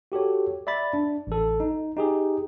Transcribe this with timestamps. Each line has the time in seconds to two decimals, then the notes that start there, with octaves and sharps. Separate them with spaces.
0.12 F#4 G4 A4 C#5
0.67 D5 E5 B5 A6
0.93 D4
1.27 A1 A4
1.60 D#4
1.97 D#4 G4 G#4